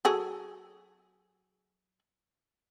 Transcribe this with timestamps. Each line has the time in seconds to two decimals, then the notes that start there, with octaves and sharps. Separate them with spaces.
0.05 F#3 G#4 A4